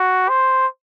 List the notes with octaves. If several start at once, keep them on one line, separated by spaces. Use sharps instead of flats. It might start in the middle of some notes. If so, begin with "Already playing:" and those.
Already playing: F#4
C5